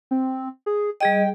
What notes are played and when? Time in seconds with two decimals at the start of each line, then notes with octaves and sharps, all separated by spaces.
0.11 C4
0.66 G#4
1.00 G3 G#4 D#5 G5